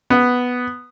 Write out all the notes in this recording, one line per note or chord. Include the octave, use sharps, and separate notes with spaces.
B3